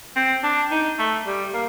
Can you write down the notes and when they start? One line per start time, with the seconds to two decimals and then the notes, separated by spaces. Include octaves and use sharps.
0.16 C4
0.43 D4
0.71 D#4
0.99 A3
1.26 G3
1.54 A#3